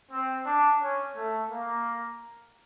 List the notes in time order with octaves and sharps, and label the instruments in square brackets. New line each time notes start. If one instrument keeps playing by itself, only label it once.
[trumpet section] C4
D4
C#4
A3
A#3